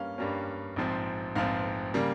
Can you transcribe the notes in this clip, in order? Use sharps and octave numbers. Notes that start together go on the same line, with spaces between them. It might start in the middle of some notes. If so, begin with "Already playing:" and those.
Already playing: G2 G3 A#3 C#4 F5
G2 G3 A#3 C#4
A#1 G#2 F3 C4
A#1 G#2 F3 C4 F5
C#3 G3 A#3